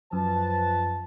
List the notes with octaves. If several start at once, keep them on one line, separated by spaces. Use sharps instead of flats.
F#2 F3 B4 A5